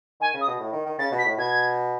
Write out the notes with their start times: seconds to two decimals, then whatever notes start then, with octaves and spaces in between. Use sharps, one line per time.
0.20 D#3 G#5
0.34 C#3
0.41 D#6
0.47 B2
0.60 A2
0.73 D#3
0.86 D#3
0.99 C#3 A6
1.12 B2
1.18 B6
1.25 A2
1.38 B2 G#6